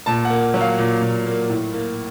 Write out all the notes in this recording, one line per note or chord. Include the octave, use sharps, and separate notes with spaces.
A#2 A5
F#5
A#3
F#3
F5
A#2
A#2
A#3
A2
A#3